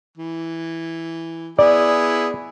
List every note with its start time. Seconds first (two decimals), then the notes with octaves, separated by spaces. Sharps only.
0.18 E3
1.59 B3 E4 G#4 D5